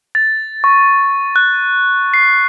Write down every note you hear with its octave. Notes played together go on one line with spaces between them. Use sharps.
A6
C#6
F#6
C7